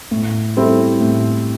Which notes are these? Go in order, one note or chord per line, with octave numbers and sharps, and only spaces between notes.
A2
G3 C4 E4 A4
A2